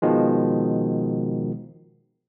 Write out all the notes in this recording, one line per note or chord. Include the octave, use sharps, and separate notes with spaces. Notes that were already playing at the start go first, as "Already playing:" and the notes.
B2 D#3 F3 G#3